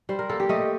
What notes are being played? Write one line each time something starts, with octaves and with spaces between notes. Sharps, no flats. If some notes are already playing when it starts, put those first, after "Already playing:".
G3 C5
A#4
A#3 A4
G4
A3 D#5